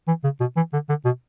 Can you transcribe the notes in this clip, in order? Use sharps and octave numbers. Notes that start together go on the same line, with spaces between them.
E3
C#3
B2
E3
D3
D3
B2